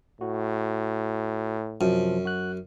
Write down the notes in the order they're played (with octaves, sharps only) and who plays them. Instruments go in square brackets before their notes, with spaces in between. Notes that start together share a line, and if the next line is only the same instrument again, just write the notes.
[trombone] A2 [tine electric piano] F#4
[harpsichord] F#2 [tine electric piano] C3 F3
[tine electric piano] F#4 F#6